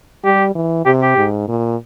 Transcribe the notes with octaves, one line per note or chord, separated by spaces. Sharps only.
G3 G4
E3
C3 G4
G4
G#2
A#2